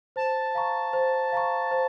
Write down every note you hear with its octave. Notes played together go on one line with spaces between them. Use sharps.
C5 A5
F5 A#5 C#6
C5
F5 A#5 C#6
C5